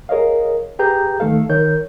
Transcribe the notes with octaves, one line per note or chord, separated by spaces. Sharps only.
G#4 A#4 C#5 D#5 F5
G4 G#4 B4 G5 A#5 G6
D#2 D#3 A3 A4 F5
D#3 A#4 C#5 G6